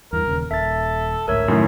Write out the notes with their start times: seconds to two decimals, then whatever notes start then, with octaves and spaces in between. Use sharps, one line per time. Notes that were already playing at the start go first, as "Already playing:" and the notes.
0.13 E2 G2 A#4
0.24 D#1 D#2 C#3
0.51 D#1 A4 E5 A6
1.28 A1 D2 G#2 A#4 C#5 E5
1.48 F#2 A2 C3 D#3 A3